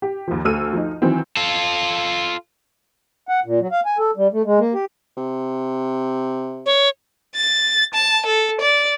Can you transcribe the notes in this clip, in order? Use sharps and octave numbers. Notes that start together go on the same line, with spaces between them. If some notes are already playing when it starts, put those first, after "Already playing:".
G4
D#2 F3
D2 A4 E6 F6 D#7
F3 D#4
D#3 E3 F#3 C4
F4 A4
F#5
A#2
F#3
F5
G#5
A4
G3
A3
G#3
A#3
G4
C3
C#5
A6
A5
A4
D5